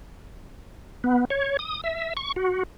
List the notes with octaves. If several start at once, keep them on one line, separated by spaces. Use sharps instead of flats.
B3
C#5
D#6
E5
C#6
F#4